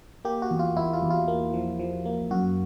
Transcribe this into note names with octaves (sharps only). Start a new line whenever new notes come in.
A#3 G4
F#4
E2
F4
E2 E4
F4
E2
F4
A#3
F3
F3
A#3
F#2 F#4